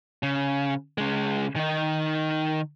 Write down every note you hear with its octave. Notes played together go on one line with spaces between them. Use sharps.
C#3
C#3 G#3
D#3 D#4